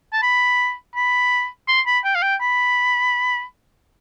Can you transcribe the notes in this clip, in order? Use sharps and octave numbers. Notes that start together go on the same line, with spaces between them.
A5
B5
B5
C6
B5
G5
F5
G5
B5